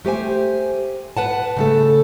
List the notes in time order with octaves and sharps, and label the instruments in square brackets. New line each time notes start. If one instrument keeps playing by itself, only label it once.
[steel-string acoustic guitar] A3 G4 C5 G#5
B4 F#5 A5
C#3 A3 A4